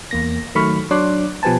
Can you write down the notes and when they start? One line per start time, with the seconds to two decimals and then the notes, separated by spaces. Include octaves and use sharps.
0.11 E2 A#3 A#6
0.55 D#3 F#3 A3 B5 C#6 F6
0.91 F#3 D4 C#5 C6 D6 F#6
1.43 B2 F3 G4 B4 G#5 A5